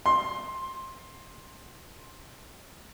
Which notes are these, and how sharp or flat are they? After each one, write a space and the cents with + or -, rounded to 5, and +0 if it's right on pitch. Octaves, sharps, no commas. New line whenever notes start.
C6 +15